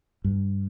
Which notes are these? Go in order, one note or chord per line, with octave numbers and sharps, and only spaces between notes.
G2